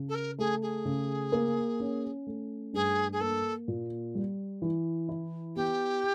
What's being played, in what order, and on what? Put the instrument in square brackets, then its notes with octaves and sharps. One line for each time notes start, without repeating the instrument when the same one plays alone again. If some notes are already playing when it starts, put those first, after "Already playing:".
Already playing: [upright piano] C#3
[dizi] A4
A#4
[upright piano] A3 [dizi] G#4
[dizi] G#4
[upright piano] C#3
A#3
C#4
A3
[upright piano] G2 [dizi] G#4
[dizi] G#4
[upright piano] A#3 [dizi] A4
[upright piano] A#2
G3
E3
E4
[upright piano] B3 [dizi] G4